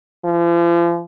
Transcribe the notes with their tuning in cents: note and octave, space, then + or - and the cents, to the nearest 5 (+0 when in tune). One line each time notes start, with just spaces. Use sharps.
F3 -40